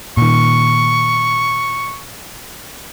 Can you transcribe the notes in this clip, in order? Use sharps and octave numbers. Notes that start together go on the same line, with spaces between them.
A#2 D#3 C#6